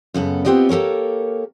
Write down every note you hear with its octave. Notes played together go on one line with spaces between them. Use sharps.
F#2 C#3 B3 A4
B3 C4 F4 G4 D5 D#5
A#3 G4 A4 A#4 C#5